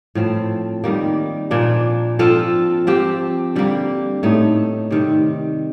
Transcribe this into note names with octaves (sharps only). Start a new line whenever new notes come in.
A2 F3 C4
D#3 G3 A#3
A#2 F3 A#3 D4
F3 C4 F4 A4
F3 C4 G4
D3 G3 A#3
A2 A3 D#4
C3 D#3 G3